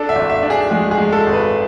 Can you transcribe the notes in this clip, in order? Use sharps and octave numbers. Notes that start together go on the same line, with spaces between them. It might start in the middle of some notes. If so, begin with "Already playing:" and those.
Already playing: D4 A4
E5
G#1
E5
D4
G#4
G#3 G#4
G#4
G#3
A4
G#1
B4